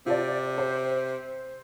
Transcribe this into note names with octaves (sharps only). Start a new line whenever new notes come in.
C3 F4 D5
C5